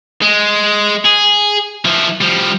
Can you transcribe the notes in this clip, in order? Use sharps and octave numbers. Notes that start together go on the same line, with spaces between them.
G#3
G#4
F3 E4
F3 G3